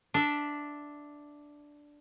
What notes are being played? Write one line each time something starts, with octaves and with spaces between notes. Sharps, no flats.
D4 E5